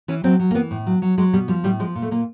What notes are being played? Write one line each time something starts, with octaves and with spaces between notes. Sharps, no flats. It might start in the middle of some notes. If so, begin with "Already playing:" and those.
E3 C#4
F#3 C4
F#3
A#3
E3 B3
A2
F#3
F#3
F#3 G#3
B2 G3
F3 G3
A2 G3
F3 G#3
A#2
A3
A#2 A#3